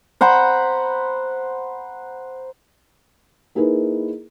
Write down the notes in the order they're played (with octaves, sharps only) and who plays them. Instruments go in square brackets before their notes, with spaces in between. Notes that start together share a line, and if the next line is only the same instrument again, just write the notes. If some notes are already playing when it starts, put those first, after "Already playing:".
[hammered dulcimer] C5 F#5 A#5 B5
[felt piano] A#3 D#4 E4 G#4 A#4 B4